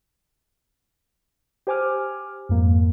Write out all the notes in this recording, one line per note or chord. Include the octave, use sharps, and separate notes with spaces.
G4 C5 G#5 D6 F6
F2 G#2 A#3